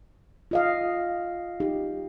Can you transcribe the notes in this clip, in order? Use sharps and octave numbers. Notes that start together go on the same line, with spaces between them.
F4 D#5 F5
D#4 G4